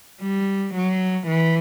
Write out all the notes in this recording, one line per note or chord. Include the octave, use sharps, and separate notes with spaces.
G3
F#3
E3